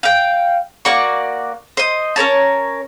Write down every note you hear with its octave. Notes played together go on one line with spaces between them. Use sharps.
F5 G5
A#3 F#4 D5 C#6
C5 D#5
C#4 A#4 C#5 A5